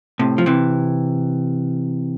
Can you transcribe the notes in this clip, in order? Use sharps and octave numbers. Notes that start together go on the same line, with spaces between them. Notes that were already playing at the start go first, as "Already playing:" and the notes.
A2 C3
F3
C3 E3